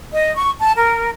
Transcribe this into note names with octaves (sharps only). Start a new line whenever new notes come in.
D#5
C#6
A5
A#4